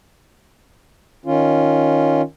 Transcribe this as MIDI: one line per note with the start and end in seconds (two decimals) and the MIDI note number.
1.26 2.22 51
1.26 2.22 61
1.26 2.22 65